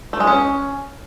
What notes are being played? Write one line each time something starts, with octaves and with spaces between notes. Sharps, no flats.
A3
G#3
C#4